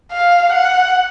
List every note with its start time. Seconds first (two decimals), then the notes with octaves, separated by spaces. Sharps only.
0.12 F5
0.52 F#5